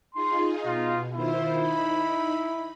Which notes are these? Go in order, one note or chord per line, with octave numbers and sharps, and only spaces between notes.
D#4 F4 G#4 C6
B2 D#4 F4
D#3 E4 F4 C5
D#4 B5